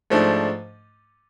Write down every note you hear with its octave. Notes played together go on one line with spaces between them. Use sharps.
G#2 F3 A3 D4